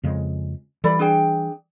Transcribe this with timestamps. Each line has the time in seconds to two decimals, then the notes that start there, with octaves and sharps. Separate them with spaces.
0.03 F2 C#3 G#3
0.84 E3 G3 A4 D5 B5
0.99 D4 G#4 G5